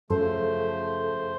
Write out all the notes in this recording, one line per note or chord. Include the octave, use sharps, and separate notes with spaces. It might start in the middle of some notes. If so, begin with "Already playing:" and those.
F#2 C#3 F3 A3 A4 C5